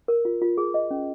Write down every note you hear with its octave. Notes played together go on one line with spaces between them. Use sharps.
A#4
F4
F4
G#4
D#5
C#4